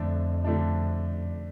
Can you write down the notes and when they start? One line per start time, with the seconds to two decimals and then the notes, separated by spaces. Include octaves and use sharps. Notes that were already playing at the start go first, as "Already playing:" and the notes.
Already playing: F2 D3 A3 D4
0.45 D3 A3 D4